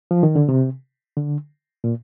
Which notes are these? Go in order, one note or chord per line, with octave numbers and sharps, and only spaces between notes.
F3
D#3
D3
C3
D3
A#2